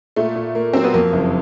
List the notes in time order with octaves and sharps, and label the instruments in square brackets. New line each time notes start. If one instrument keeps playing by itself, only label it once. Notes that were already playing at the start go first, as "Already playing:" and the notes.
[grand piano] A#2 [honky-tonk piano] A3
[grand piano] A#2
A#3
[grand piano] F#3 [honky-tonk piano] C4
[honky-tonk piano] B3
[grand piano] F2 [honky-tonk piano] A#3
[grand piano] F#1